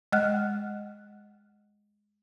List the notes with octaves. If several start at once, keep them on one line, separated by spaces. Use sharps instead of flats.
G#3 D#5 F#5 F6 F#6